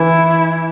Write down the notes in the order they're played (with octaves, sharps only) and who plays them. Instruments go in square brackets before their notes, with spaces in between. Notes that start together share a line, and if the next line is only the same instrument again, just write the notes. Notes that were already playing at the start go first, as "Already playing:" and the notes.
Already playing: [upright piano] E3 [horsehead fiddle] E4